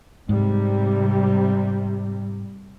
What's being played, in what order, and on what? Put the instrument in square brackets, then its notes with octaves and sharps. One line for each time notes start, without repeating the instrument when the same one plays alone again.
[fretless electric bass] G#2 [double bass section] C3 G3